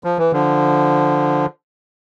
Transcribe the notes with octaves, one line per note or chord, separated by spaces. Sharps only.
F3
E3
D3 F3